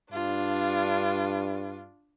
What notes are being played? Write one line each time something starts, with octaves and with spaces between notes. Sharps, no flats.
G2 D4 F4